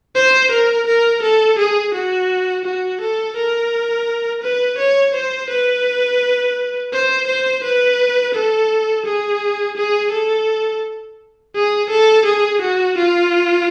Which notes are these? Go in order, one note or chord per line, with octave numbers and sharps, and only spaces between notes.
C5
A#4
A#4
A4
G#4
F#4
F#4
A4
A#4
B4
C#5
C5
B4
C5
C5
B4
A4
G#4
G#4
A4
G#4
A4
G#4
F#4
F4